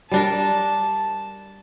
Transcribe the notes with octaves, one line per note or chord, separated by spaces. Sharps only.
G3 D4 A#4 A5